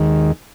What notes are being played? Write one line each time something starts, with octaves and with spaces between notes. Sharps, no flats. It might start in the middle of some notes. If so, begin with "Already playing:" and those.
Already playing: D#2 D#3 G#3